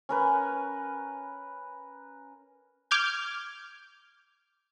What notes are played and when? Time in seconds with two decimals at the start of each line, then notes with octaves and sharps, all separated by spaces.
0.09 C#4 A#4 B4
2.91 D6 F6 G6 G#6